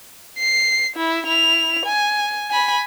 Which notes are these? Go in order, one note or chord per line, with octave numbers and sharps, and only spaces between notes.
C7
E4
E4 F7
G#5
G#5 B5